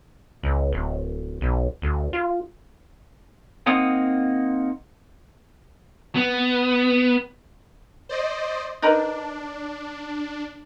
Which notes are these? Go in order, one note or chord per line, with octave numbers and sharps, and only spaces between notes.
C#2
D1
B1
D2
F4
A#3 C4 D#4 F#5 D#6
B3
C5 D5 D#5
D4 D#4 A#4 B4